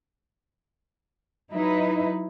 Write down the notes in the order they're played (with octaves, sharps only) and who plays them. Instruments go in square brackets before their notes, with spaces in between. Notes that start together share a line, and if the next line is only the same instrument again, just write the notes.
[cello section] F#3 D#4 E4 B4